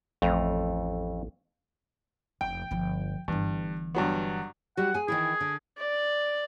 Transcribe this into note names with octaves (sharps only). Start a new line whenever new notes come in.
A1 F2 A3 A#5
F1 G5
G1 F3
G1 G2 E3
G2 F#3 B3
G3 F#4 F#5
G#4 G#5
D#3 E3 E4 G#4
D3
D5